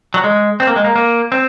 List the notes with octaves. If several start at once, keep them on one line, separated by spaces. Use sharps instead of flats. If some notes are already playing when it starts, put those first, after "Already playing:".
F#3
G#3
C4
A#3
G#3
A#3
A#3
C4